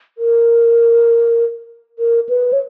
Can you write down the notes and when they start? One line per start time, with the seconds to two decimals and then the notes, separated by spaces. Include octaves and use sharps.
0.18 A#4
1.99 A#4
2.29 B4
2.53 C#5